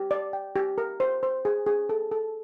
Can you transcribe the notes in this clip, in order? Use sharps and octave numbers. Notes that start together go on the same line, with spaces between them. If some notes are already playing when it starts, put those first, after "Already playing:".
Already playing: G4
D5
G5
G4
A#4
C5
C5
G#4
G#4
A4
A4